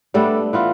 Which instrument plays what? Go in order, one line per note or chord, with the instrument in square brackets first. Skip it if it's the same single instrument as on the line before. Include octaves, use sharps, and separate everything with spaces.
[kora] G3 B3 D4 A4 [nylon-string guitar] A3
[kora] E3 B3 F4